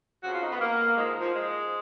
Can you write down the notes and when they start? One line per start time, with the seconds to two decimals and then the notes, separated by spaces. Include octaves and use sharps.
0.23 F2 C#3 F3 F#4
0.32 F4
0.41 D#4
0.51 B3
0.59 A#3
0.96 G#2 F3 G#3
1.20 F3
1.32 G#3